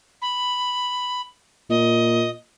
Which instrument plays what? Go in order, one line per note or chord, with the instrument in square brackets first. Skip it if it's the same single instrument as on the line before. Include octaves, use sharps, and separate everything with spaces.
[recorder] B5
[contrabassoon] A#2 [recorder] D#5